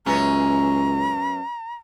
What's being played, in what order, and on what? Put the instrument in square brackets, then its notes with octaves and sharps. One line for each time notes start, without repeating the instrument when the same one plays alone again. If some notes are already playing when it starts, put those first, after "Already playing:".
[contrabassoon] C#2 [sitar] F#2 B3 C#4 [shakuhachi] A#5